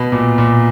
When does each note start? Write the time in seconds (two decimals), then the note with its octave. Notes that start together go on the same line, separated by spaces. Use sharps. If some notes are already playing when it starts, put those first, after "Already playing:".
Already playing: B2
0.12 A#2
0.38 A#2